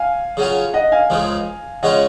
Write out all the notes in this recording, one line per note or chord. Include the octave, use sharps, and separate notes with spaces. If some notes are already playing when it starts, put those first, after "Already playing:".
Already playing: F5 G#5
C#3 F#3 C#4 F4
D#5 F#5
F5 G#5
C#2 C#3 F3 G#3
C#3 G#3 C#4 F4 D#5 F#5